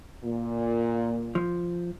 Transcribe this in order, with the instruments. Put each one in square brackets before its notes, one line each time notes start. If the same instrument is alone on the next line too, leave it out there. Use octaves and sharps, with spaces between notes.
[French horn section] A#2
[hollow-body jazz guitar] F3